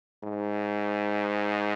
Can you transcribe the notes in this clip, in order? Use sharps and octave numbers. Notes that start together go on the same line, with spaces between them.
G#2